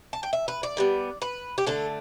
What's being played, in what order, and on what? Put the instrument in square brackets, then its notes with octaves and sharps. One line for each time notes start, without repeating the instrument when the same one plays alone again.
[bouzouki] A5
G5
E5
B4
D5
D3 G3 B3
B4
G4
D3 A3 D4 A4